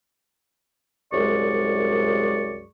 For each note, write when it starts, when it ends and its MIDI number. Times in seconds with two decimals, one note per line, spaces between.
1.12 2.65 36
1.12 2.65 42
1.12 2.65 56
1.12 2.65 68
1.12 2.65 74
1.12 2.65 85